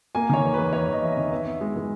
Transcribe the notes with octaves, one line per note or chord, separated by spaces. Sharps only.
A#3 G#5
D#3 C#5
E2
E2 B4
E2 C#5
E2 D#5
E2 E5
D#5
D#3
B3 E5
B3
G#3
E3